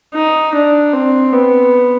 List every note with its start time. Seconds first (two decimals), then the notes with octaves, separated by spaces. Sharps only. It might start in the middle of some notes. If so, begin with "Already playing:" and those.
0.15 D#4
0.55 D4
0.93 C4
1.33 B3